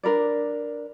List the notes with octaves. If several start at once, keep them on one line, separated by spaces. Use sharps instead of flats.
D4 A#4 B4 D5